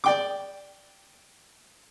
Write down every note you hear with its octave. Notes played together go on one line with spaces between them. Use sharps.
D5 G5 D6